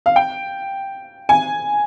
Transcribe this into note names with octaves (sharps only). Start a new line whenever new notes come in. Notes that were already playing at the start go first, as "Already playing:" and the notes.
F5
G5
G#5